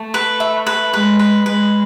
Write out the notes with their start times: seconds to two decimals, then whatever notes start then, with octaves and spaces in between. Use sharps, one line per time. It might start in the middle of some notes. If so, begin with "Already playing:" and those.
Already playing: A3
0.14 B4
0.40 E5
0.66 B4
0.93 G#3 B4
1.19 B4
1.46 G#3 B4